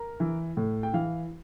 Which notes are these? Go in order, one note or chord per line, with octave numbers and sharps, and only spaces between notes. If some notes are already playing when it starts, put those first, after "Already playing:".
Already playing: A#4
E3
A2
G5
E3 F5